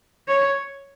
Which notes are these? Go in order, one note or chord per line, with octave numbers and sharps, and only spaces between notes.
C#5